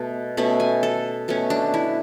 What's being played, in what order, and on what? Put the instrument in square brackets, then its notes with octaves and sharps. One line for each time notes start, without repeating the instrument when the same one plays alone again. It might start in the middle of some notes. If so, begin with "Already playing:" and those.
Already playing: [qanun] B2 A3
B2 A3 C#4 B5
G#5
A4
B2 A3 C#4
D4
E4